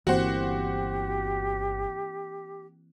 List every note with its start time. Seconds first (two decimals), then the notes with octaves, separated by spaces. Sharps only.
0.07 G1 E3 A#3 C4 F#4 G4 C5 F#5